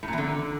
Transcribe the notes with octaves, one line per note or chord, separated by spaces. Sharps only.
A2
A#2
E2
D3